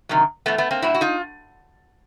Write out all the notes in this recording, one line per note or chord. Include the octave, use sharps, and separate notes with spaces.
C3 D#3 F#3
A2 E3 A3 B3
A3 B3
A#3 C4
A2 F#3 E4 F#4
F#4
D#4 F4